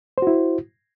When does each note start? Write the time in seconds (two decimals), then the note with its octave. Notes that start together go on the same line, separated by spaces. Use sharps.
0.18 C5
0.22 F#4
0.27 E4